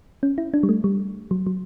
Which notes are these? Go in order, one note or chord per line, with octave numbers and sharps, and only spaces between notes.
C#4
E4
D4
G3
A3
G3
F#3
F#3